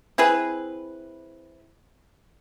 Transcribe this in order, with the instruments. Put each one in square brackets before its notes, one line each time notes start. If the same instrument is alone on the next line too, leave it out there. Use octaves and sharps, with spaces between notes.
[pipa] C4 E4 G#4 B4